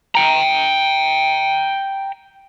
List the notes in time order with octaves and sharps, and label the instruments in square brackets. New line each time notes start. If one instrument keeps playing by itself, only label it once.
[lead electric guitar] G5 A#5